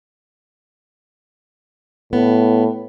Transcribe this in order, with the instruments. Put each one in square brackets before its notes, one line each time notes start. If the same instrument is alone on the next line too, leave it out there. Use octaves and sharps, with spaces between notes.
[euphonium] A2 [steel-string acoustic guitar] B3